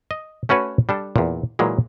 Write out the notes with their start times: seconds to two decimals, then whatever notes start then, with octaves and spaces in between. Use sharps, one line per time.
0.11 D#5
0.49 A3 C#4 F#4 B4 C#5
0.89 G3 D4 A4
1.16 E2 A#2
1.59 A#2 E3 F#3 G#3